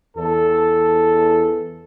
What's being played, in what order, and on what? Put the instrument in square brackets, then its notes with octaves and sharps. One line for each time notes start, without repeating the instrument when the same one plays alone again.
[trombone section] E2 A4